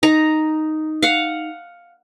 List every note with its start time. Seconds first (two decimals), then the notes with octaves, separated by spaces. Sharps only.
0.03 D#4 A#5
1.02 F5 F#5